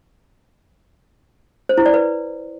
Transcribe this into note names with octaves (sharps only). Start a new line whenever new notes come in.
C5
E4
D5
B4